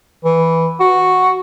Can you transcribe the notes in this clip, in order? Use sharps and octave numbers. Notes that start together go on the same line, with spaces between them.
E3
F#4